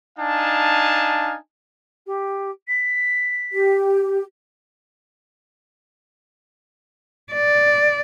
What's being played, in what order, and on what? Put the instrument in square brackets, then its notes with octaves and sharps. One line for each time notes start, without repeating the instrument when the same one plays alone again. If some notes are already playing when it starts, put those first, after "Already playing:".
[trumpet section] D4 D#4 F5 G#5 A5
[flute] G4
B6
[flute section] G4
[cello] D5